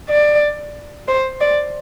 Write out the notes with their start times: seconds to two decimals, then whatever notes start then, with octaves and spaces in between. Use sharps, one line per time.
0.10 D5
1.08 C5
1.41 D5